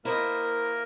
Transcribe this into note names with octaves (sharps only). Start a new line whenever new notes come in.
A#3 E4 A#4 C5 D#5